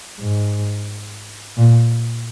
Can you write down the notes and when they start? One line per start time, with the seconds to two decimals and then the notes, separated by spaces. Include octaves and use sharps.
0.20 G#2
1.57 A#2